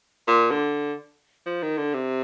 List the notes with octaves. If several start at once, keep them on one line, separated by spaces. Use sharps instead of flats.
A#2
D3
F3
D#3
D3
C3